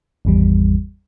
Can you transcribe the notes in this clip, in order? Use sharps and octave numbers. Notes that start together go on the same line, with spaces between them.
G#1 E2 G3